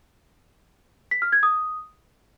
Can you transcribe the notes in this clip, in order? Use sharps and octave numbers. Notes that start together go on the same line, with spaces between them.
B6
F6
G#6
D#6